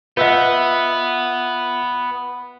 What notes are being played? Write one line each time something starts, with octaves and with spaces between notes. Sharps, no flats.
B3 F4 B4 D#5 E5 F#5